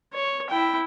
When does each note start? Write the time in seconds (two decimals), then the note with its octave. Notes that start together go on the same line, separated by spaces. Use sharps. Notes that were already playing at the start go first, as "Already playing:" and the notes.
0.14 C#5
0.50 E4 G5